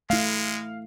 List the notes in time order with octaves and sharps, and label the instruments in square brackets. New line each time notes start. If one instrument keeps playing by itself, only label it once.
[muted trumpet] G#3 [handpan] A3 E4 [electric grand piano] F5